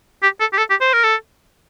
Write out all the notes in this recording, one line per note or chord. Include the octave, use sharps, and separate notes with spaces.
G4
A4
G4
A4
G4
C5
A#4
A4